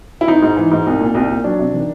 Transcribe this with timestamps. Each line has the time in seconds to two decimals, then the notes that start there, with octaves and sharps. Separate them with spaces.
0.21 E4
0.28 G#1 D#4
0.42 G#2
0.56 E3
0.71 G#2
0.86 C2
1.00 A#2
1.15 C2
1.30 A#2
1.44 F#3 D4
1.59 C3
1.74 D#3